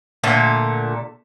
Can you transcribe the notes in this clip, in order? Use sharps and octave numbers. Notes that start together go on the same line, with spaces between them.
A#2 D3 A3